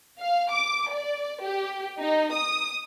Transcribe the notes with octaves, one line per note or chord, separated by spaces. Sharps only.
F5
D6
D5
G4
D#4
D#6